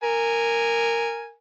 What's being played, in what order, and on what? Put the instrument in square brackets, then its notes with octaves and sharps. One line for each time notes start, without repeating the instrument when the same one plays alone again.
[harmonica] A#4 G#5